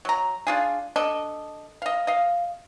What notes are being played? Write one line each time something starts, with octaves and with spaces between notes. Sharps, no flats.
F#3 A#5
D4 F4 G#4
D4 A4 D#5
D#5 F5
D#5 F5